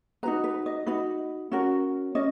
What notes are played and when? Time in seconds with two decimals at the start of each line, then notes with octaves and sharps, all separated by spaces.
0.23 D#4 F#4 B4 A#5
0.44 B4
0.66 D#5
0.86 D#4 F#4 B4
1.52 C#4 F#4 A#4
2.15 C#4 D#5